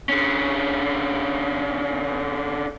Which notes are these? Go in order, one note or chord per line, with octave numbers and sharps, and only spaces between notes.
D3 C#4